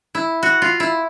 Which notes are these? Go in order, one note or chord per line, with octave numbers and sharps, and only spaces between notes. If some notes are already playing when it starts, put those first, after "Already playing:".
E4
F#4
F4
E4